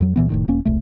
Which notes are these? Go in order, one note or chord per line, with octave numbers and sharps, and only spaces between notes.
F2 F#3
C#2 A#2 E3 B3
F1 A2 D#3
E1 A#3 C#4
E1 C2 A3